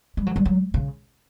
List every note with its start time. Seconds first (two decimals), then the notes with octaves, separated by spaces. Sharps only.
0.17 G3
0.26 F#3
0.36 G3
0.45 F#3
0.74 C#3